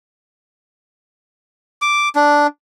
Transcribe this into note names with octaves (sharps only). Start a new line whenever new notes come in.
D6
D4